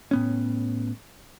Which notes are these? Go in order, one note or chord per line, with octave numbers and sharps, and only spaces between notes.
A2 B3 C#4